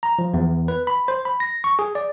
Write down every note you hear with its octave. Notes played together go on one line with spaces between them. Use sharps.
A#5
F3
E2
B4
B5
C5
B5
A#6
C#6
G#4
D5